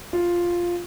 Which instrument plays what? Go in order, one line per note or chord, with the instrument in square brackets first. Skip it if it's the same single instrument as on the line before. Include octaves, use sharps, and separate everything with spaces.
[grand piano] F4